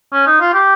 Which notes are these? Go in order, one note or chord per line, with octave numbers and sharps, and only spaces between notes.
C#4
D#4
F4
G4